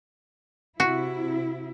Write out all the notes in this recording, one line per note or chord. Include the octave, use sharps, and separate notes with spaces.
C3 E4 F#4